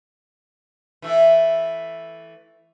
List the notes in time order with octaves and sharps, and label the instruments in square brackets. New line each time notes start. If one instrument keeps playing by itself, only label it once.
[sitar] E3 A3 E4